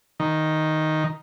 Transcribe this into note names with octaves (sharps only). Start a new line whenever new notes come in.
D#3